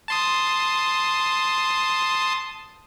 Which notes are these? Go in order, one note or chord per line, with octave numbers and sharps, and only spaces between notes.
A5 C6 D#6